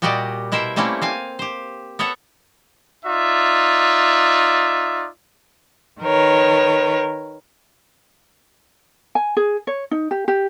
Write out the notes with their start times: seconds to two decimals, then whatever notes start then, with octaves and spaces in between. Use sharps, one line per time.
0.02 A#2 G3 F#4 G4 D5 D#5
0.52 B2 E4 A#4 C5 E5
0.76 G3 A3 A#3 C4 C#4 E4
1.02 C4 F5 G#5
1.39 G4 C5
1.99 B3 A4 C#5 E5 F#5
3.04 D#4 F4 D5 E5
6.02 D#3 A#4 B4 C#5
9.15 G#5
9.37 G#4
9.67 C#5
9.91 D#4
10.11 G4
10.28 G4